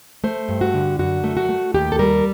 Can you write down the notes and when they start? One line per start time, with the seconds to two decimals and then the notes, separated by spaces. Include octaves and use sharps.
0.24 A3 C5
0.49 G2
0.61 F#4
0.74 D3
0.99 F#2 F#4
1.24 A3
1.37 F#4
1.49 A3
1.74 D#2 G4
1.92 A4
1.99 G3 A#4